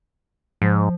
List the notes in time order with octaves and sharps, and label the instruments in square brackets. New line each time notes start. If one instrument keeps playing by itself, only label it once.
[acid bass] G#2 [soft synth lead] F3